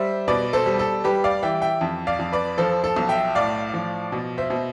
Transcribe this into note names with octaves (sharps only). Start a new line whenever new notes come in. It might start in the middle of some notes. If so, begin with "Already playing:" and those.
Already playing: G3 C5 E5
B2 B4 D5
A4 C5
G3
A4
G3 G4 B4
D5 F5
E3 E5 G5
E5 G5
F2
D5 F5
F2
B4 D5
F3 A4 C5
A4
B1
E5 G5
A2 D5 F5
F3
B2
C5 E5
B2